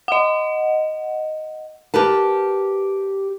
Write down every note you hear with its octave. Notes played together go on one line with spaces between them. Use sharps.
D#5 F#5
G4 A#4 B4 A5